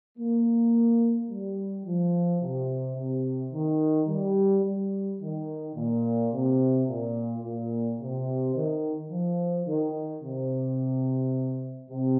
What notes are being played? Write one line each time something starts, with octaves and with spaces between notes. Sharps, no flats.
A#3
G3
F3
C3
C3
D#3
G3
G3
D#3
A#2
C3
A#2
A#2
C3
D#3
F3
D#3
C3
C3